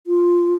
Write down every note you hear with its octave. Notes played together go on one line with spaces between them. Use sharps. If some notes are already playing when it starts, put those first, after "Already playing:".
F4